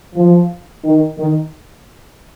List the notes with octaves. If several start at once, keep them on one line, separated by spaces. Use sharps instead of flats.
F3
D#3
D#3